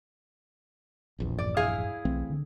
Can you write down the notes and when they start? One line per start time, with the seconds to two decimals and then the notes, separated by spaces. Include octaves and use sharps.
1.18 D1 A#1 E2
1.39 G2 D5
1.57 E4 G#4 F5
2.05 B1 E3 A3 C4
2.30 D3